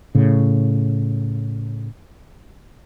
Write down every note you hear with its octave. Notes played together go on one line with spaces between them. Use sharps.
A2 C#3